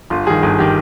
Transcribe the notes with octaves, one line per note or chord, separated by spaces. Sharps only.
G1 F4
G2 D#3 G#4
G1 G#4
D#3 G4